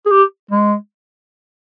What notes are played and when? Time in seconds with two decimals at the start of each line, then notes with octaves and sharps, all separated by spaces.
0.06 G#4
0.11 G4
0.51 G#3